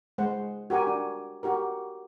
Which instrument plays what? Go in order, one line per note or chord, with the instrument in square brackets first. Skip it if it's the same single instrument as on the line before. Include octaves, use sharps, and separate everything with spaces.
[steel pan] G#3 C5 F#5
F#4 G4 A#4 G#5
D4
F#4 G4 A#4